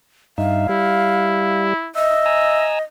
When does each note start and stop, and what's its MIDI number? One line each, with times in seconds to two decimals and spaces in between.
0.38 0.67 43
0.38 0.67 63
0.38 0.67 76
0.38 1.62 77
0.69 1.74 55
0.69 1.88 64
1.95 2.82 75
1.95 2.67 76
2.26 2.79 80
2.26 2.79 82
2.26 2.79 88